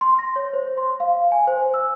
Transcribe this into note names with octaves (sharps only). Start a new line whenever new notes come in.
C6
A#6
C#5
C5
C6
F5
G#5
C5
E6